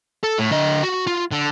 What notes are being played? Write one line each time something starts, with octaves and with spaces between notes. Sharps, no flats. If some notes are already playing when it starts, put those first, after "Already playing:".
A4
A2
D3 D#5
F#4
F4
D3